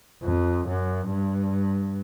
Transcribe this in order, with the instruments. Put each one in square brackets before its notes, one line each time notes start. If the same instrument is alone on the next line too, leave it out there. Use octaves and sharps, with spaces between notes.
[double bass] F2
F#2
G2